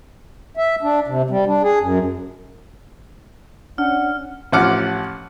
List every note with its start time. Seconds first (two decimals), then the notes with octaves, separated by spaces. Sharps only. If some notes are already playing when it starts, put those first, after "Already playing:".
0.57 E5
0.82 D4
1.08 C3
1.30 G3
1.47 D4
1.63 G#4
1.80 F#2
3.78 C#4 D4 F#5 F6
4.52 A1 F3 F#5 D6 F6